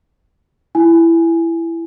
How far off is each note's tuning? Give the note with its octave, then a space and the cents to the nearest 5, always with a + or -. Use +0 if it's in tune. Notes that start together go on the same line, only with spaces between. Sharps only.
E4 +15 G#5 +0